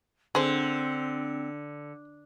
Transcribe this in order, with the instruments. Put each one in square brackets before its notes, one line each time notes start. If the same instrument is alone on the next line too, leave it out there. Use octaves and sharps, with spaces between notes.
[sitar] D3 [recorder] C4 [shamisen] G#4 C5